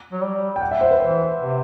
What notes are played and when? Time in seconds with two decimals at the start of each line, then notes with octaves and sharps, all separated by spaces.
0.12 F#3
0.22 G3
0.56 G5
0.61 F#5
0.71 E5
0.81 C5
0.91 B4
1.00 E3 C5
1.39 C3